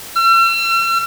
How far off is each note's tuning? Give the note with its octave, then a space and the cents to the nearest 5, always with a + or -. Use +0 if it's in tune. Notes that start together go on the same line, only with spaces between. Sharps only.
E6 +45